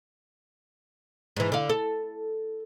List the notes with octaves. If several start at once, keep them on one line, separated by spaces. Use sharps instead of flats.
G#2 E3
D3 F5
A4